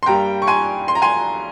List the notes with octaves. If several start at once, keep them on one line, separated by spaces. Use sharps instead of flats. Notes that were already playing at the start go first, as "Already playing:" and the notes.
C6
G2 G3 A#3 G5 A#5
C#6
G#5 C6
C6
A#5
G#5 C6